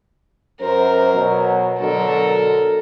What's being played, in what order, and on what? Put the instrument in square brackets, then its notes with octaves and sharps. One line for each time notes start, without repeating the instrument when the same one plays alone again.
[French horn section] F#2 C5 [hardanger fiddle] A#4
[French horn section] B2 F#3
[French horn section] B2 D3 F#3 [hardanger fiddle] A4 A#4